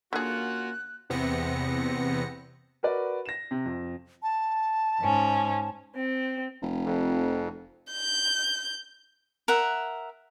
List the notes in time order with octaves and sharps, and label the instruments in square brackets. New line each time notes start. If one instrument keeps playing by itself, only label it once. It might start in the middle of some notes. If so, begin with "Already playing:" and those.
[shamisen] D3 G#4 [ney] A#3 [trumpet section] C#4 F4 F#4 [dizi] F#6
[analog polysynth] E2 C3 B3 C4 A#6 C#7
[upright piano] F#4 A#4 B4 D5
A#6 E7
C3
F2
[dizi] A5
[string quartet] G#2 C#4
C4
[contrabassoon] F1
[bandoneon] F2
[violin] G6
[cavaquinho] A#4 E5 F#5